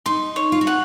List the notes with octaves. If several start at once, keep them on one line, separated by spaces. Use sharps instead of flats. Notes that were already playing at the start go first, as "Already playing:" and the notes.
D#4 C6
C#5
F4
F#4
F#5